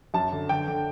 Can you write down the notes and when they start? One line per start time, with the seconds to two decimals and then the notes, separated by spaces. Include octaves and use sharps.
0.14 F#2 A5
0.33 D3
0.49 D3 G5
0.68 D3